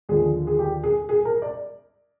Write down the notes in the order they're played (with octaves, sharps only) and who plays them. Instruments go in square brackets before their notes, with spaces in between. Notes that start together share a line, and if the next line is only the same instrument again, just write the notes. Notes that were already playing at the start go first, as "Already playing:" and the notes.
[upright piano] D#2 D3 F3 G#4
G#4
G4
G#4
G#4
A#4
D5